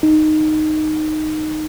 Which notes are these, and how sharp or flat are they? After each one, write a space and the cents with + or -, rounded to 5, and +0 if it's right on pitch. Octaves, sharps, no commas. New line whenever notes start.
D#4 -10